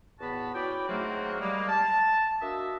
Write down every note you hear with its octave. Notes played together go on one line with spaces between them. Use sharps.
E2 A2 B3 F#4 A5 B5
C#4 E4 F#4 B4 D5 G5
G#2 F#3 A3 A#3 C4 F#4
G3 G#3 A#3
A5
A#3 D4 F#4 D#5 E5